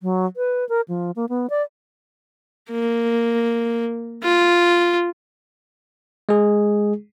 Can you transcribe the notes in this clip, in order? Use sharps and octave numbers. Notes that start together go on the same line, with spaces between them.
F#3
B4
A#4
F3
A#3
B3
D5
A#3
F4
G#3 G#4